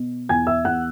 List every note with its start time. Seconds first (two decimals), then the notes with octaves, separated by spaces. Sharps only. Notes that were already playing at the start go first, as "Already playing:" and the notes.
Already playing: B2
0.29 E2 G#5 G#6
0.47 E5 E6
0.65 E2 F#5 F#6